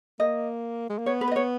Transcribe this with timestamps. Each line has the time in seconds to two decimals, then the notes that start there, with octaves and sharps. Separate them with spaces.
0.20 A#3 D#5
0.90 G#3
0.98 A#3
1.06 B3 C#5
1.21 B4
1.31 D#5
1.36 C#5